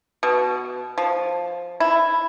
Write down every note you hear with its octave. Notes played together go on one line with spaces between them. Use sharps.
B2
F3
E4